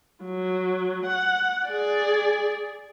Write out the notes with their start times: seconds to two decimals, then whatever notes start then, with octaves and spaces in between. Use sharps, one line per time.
0.24 F#3
1.06 F#5
1.67 G#4 D5